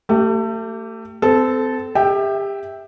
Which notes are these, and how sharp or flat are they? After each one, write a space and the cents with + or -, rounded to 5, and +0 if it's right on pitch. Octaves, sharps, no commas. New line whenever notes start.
A3 +35 G4 -15
C4 -30 A4 -10
G4 +30 E5 -10 G5 +0